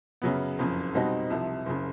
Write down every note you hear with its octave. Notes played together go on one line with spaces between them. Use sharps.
F#2 C#3 F#3 B3
F#1 F2 C#3
B2 G3 C4 D#4 F#4
C2 C3 F3
F#1 C#3